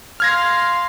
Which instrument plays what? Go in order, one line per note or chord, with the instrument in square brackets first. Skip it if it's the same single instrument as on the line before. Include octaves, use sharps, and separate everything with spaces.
[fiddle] F5 C6 [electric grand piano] F6 G#6 A#6